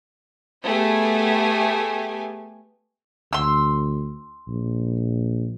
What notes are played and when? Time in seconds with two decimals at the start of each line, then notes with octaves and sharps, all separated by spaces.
0.65 A3 B3 G4 G#4 G#5
3.33 D2 C6 E6
4.48 A#1